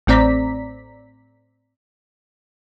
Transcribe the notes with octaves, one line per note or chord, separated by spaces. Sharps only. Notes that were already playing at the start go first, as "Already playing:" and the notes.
A1 A2 C4 D5 A#5 B6